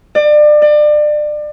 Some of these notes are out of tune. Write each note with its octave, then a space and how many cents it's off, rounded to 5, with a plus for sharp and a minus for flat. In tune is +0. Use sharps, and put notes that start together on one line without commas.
D5 +30
D5 +30